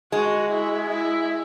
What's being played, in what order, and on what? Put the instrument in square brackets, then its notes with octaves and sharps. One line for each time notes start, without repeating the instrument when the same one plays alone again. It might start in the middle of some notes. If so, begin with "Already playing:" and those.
[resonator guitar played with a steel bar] G#3 [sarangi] F#4
[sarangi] E4
E4